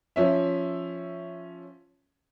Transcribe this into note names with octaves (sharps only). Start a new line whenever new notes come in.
F3 C#4 E5